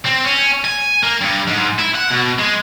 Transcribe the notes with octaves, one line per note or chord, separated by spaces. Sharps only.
C4
C#4
G#5
A#3
G2
G#2
E4
F#5
B2
G#3